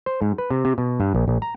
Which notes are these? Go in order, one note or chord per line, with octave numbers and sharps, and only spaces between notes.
C5
G#2
B4
C3
C3
B2
G2
A#1
A#1
A#5